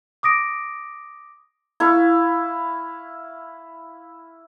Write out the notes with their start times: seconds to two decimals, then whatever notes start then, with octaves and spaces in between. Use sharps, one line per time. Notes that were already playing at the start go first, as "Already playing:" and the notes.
0.23 D6 D#6 A#6 D7
1.80 E4 F5 C#6